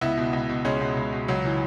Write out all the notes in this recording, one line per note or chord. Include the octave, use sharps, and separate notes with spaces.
C#2 B3 E4
B2
C#2
B2
C#2 G#3 C#4
B2
C#2
B2
C#2 F#3
C#3 E3